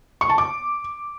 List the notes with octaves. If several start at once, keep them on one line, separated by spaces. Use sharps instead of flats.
C#6
A5
D6